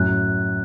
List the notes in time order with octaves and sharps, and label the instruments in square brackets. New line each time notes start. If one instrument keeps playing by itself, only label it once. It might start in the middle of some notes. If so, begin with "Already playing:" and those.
Already playing: [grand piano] F#2 A2 [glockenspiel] F#6